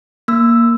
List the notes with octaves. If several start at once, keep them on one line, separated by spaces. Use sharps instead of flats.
A#3 E6